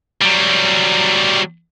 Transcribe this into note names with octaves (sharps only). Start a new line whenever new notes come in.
F#3 G3